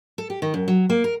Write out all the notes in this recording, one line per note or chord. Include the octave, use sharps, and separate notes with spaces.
A4
G4
D#3
F#2
F#3
A#3
A#4